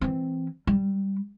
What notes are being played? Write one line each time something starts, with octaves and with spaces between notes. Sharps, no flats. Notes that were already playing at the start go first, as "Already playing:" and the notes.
E3 C4
G3